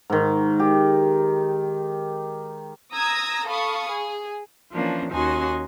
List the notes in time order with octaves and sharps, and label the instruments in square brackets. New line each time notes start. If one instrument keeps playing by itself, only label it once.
[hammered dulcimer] G#2 D#3
G4
[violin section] A#5 D#6 E6 G#6 A#6
A4 F5 B5 C#6 D#6
G#4
[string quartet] E3 F3 A#3 C#4 D4
D#2 C#4 D#4 F#4 G#5 C6